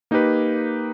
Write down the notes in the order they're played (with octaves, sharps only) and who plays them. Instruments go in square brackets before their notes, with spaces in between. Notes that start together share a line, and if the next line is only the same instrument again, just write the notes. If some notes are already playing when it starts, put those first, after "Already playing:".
[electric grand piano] A#3 D#4 G4 B4